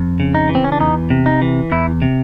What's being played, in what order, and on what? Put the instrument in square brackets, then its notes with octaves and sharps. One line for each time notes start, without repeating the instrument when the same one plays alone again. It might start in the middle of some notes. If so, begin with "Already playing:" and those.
Already playing: [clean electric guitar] F2
C#3
D#4
E3
C4
C#4
D4
E2 D#4
C3
D#4
E3
E2 E4
C3